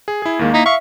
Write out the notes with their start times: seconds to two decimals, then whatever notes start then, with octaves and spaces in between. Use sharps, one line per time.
0.08 G#4
0.22 E4 G#4
0.39 D#2 D#3 G#3 A#3
0.54 D#4 E4 B6
0.66 E5 F5 C#6